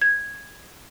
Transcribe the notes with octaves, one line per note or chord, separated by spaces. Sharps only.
G#6